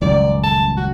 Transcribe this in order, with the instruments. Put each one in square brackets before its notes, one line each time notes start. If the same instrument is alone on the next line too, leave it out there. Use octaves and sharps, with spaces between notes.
[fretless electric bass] D#1 C#2 F#2 [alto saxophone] D5
[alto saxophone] A5
F#4